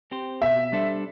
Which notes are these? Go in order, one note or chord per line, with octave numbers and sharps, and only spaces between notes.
C4 G4 C5
B2 E5
G3 D4 A4 C5